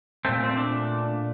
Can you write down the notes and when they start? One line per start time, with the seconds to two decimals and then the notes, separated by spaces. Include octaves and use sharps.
0.25 A#2 A3 C4
0.43 C4
0.57 D4